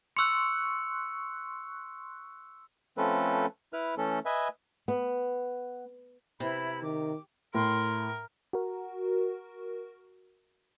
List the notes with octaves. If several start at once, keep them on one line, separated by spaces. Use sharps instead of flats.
C6 C#6 E6 F#6 C#7
F3 A3 C4 C#4 A4 B4
E4 B4 F6
E3 A3 C#4 A4
B4 D#5 E5 G#5
B3
C3 E4 B4 B5
D#3 D6
A2 A#4 C6
F#4 A#4